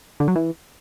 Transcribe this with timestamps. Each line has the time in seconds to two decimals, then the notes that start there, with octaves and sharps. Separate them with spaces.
0.20 D3
0.28 F#3
0.36 E3